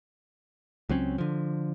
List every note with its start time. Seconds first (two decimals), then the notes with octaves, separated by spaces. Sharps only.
0.89 C#2 F#3 C4 C#4
1.18 D3 F3